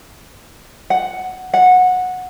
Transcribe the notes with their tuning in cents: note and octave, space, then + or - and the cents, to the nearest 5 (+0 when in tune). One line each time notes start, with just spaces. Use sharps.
F#5 +5
F#5 -15